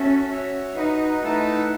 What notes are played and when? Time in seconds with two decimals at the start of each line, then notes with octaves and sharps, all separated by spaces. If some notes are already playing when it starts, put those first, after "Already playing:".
Already playing: C#4 F#4 A4 E5
0.29 F#4 C#5 E5
0.76 D#4 F#4 B4 F#5
1.22 A3 D#4 E4 B4 F#5 A5